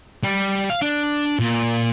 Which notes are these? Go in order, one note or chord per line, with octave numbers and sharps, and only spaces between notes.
G3
F5
D4
A#2